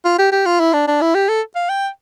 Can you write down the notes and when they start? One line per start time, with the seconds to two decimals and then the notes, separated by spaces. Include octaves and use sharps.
0.05 F4
0.19 G4
0.32 G4
0.46 F4
0.60 E4
0.73 D4
0.88 D4
1.01 E4
1.15 G4
1.29 A4
1.55 F5
1.70 G5